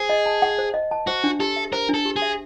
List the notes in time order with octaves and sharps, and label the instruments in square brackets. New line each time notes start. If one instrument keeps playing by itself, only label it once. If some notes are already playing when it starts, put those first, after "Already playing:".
Already playing: [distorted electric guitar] G#4 [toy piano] C5
[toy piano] D#5
A5
F#5
C5
D#5
A5
[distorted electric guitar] F#4 [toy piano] C5
[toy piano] D4
[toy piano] G4 [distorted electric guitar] A4
[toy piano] E5
[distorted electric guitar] A#4 [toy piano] C5
[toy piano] D4
[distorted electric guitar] A4
[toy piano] G4
[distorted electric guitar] G#4
[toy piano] E5